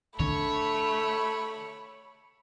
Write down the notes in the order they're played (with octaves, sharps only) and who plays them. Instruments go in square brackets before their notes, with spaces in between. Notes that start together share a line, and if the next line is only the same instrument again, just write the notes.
[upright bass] D3 D4 [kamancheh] A3 [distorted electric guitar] C#5 [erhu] B5